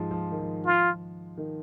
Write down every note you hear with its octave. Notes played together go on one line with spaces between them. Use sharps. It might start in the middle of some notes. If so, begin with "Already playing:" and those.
Already playing: G#2 F3 G#3
F3
D#3
F3
F4
D#3